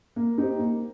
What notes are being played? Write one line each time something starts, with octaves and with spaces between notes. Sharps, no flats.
A#3
D#4 G4 C5
A#3